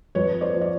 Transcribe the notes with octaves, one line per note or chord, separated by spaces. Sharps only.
F2 B4 C#5
C5 D5
F3
D5